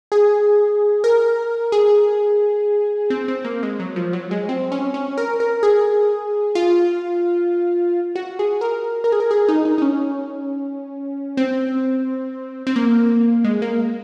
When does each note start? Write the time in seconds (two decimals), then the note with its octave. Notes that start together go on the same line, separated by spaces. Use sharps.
0.12 G#4
1.04 A#4
1.72 G#4
3.10 C4
3.28 C4
3.45 A#3
3.63 G#3
3.80 F#3
3.96 F3
4.13 F#3
4.31 G#3
4.49 C4
4.72 C#4
4.94 C#4
5.18 A#4
5.40 A#4
5.63 G#4
6.55 F4
8.16 F#4
8.39 G#4
8.61 A#4
9.04 A#4
9.12 G#4
9.20 A#4
9.31 G#4
9.49 D#4
9.65 D#4
9.78 D#4
9.82 C#4
11.37 C4
12.67 C4
12.76 A#3
13.44 G#3
13.62 A#3